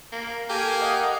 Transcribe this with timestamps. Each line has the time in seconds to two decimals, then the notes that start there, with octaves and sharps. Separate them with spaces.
0.12 A#3
0.49 A#3 G4 A4 G#5
0.81 D#5 F5 F#5